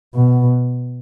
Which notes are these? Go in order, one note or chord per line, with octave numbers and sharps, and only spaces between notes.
B2